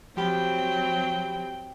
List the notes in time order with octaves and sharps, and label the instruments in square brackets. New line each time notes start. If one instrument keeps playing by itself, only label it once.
[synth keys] F3 G4 B5 [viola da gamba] F#3 C4 [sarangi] G5